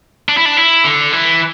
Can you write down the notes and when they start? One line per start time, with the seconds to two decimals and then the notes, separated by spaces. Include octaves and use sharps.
0.29 D4
0.37 E4
0.45 D4
0.57 E4
0.84 D3
1.13 E3